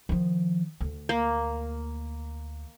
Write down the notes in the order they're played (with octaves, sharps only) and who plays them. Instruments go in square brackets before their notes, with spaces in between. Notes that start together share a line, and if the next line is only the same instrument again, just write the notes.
[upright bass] D#3 F3
D2
[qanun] A#3